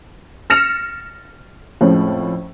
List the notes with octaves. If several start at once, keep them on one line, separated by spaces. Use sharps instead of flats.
F6 A6 A#6 C#7 E7 F7
F2 A2 F3 G#3 C#4